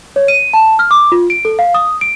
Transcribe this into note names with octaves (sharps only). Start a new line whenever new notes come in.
C#5
D#7
A5
F6
D6
F4
D7
A4
F5
D#6
D7